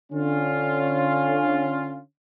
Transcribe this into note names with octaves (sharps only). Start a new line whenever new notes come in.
D3 C#4 F4